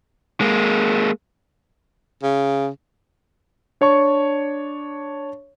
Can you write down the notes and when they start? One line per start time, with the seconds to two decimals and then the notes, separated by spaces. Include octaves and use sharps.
0.41 G#3 A#3
2.23 C#3
3.81 D4 C#5 A5 C#6